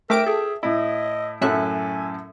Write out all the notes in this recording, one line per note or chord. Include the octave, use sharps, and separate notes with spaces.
A3 A#4 E5 G5 D6 D7
G#4 A4
A2 E4 D#5
F#2 A2 F#3 A4 E5 G#5 F#6